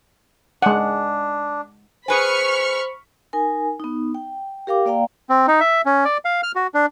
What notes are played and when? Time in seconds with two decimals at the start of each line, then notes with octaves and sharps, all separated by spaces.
0.62 G#3 D4 F#5
2.08 G#4 B4 C5 G#5 B5 C#6 F6
3.33 D#4 A#4 G#5
3.80 B3 D#4
4.15 G5
4.67 G4 A#4 F5 G5 D6
4.86 A#3 D5 F5 G5 A#5
5.30 C4
5.48 D#4
5.60 E5
5.86 C#4
6.05 D5
6.25 F5
6.43 F6
6.55 F#4
6.74 D4